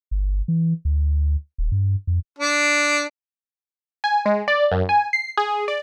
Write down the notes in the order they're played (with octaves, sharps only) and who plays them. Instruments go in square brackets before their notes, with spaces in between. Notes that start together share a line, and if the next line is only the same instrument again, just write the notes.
[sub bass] G1
E3
D2
D#1
G2
F2
[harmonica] D4
[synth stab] G#5
G#3
D5
F#2
G#5
C7
G#4
D5